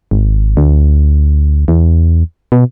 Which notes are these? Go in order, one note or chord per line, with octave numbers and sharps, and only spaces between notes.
G#1
D2
E2
B2